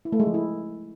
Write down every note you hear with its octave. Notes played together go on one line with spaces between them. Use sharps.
E4
A3
G#3
F3
E4